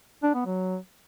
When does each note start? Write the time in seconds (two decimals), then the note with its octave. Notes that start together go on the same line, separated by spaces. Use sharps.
0.23 D4
0.34 B3
0.46 F#3